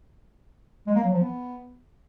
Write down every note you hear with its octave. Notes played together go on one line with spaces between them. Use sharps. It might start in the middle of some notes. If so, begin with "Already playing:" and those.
G#3
A#3
F#3
F3
B3